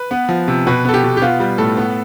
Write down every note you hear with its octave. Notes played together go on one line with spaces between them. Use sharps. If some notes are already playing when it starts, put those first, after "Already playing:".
Already playing: B4
B3
F3
C3
B2 B4
B3 A4
G4
B2
G4
B3 F4
G3
A2 A4
B3